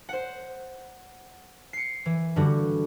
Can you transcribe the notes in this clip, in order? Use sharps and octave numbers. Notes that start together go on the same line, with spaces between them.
C5 F#5
C7 C#7
E3
G2 D3 G3 F#4